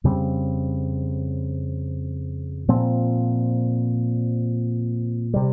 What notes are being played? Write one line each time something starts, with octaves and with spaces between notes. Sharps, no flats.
F2 C#3 G3 C4
A#2 F3 C4
C3 G3